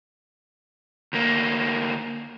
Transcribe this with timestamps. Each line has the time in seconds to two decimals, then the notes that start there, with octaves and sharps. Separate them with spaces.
1.13 D2 A#3